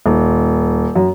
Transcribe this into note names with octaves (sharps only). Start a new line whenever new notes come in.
D#1
F#2